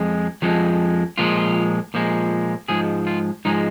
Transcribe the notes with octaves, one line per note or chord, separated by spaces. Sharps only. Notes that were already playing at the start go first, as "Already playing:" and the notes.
Already playing: F2 F3 G#3
F2 F3 G#3
A#2 F3 G#3 F4
A#2 F3 G#3
G#2 F3 G#3 G#4
F4
G#2 F3 G#3 D#4